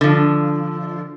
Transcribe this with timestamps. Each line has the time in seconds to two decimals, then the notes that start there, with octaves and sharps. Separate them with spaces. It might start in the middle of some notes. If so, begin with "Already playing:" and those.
0.01 D3 F3